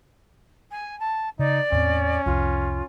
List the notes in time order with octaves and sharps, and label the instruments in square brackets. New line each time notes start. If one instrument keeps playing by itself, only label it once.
[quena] G#5
A5
[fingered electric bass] C#3 [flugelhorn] D#4 [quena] D5
[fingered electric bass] E2 A2 C4 [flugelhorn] C#4
[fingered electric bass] C2 F2 [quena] F4